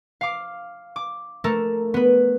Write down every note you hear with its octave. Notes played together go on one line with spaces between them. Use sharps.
F5 D6
D6
A3 A4 A#4
B3 B4